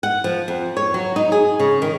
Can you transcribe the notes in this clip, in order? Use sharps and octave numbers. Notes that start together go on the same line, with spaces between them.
F#5
F3
F2
C#5
F#3
D#4
G#4
C#3
D#3